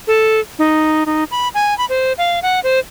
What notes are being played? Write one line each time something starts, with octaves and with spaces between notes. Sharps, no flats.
A4
D#4
D#4
B5
G#5
B5
C5
F5
F#5
C5